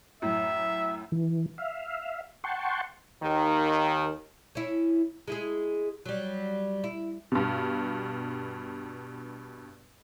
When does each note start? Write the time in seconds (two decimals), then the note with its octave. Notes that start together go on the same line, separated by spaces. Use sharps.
0.22 F#2 A2 E5
1.12 E3
1.58 E5 F5
2.44 F#5 G5 A5 C6 C#6
3.23 D#2 D#3
4.55 C#4 E4
5.28 G#3 E4 G#4
6.06 F#3 G3
6.84 E4
7.32 G2 B2